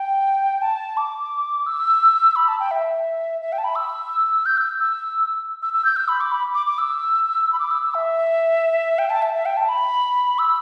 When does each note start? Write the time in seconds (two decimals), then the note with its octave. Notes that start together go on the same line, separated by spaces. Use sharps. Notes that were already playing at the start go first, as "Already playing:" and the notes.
Already playing: G5
0.62 A5
0.97 D6
1.66 E6
2.36 B5
2.48 A5
2.60 G5
2.71 E5
3.41 E5
3.52 G5
3.58 A5
3.64 B5
3.76 E6
4.46 G6
4.57 E6
4.80 E6
5.62 E6
5.73 E6
5.85 G6
5.96 E6
6.08 B5
6.21 D6
6.32 B5
6.54 D6
6.67 D6
6.78 E6
7.53 B5
7.59 D6
7.71 E6
7.83 E6
7.94 E5
8.99 G5
9.10 A5
9.22 E5
9.34 E5
9.46 G5
9.57 A5
9.69 B5
10.39 E6